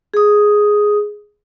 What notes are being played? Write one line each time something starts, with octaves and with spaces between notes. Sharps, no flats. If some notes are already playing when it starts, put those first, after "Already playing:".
G#4 D#6